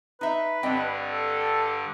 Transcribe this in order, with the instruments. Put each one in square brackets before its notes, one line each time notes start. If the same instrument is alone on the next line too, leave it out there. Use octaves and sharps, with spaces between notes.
[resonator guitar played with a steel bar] D#4 E5 [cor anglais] B4
[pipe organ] G2 D3 [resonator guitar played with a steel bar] C4 D#5 G5
[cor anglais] A4